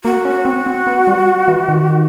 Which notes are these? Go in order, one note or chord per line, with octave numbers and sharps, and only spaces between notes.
A#3 F#4
C#4
C4
C4
B3
G3
E3
D#3